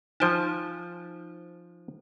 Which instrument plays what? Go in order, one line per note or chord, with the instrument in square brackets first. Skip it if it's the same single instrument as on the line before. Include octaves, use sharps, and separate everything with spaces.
[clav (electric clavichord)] F3 G5 A5 [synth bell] D#4 C5